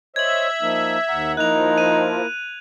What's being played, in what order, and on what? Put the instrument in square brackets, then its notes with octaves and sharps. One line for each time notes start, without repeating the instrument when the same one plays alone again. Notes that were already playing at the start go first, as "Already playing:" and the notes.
[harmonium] C5 C#5 D#5 [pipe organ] E5 [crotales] G#6 F#7
[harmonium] F3 A#3 D#4
D#2 F#5 A#5
[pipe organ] F3 [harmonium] A#3 E4 A#4 [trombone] D#4 [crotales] F#6 F7
[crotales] D#7